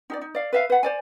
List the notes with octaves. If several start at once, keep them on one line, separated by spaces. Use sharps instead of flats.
D#4 G4 D5
D#4
D5 F5
B4 E5 F5
B4 F#5
C5 D5 G#5